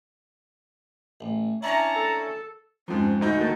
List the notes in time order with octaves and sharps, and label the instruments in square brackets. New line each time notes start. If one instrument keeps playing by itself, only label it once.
[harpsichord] A1
[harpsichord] C#4 D4 E4 [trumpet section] C#5 A5 A#5
[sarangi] A4
[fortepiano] F2 G#2 [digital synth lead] F3 [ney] C#4
[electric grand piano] D2 D#4 G6 [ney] F#4
[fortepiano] A#2 D#3 [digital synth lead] A5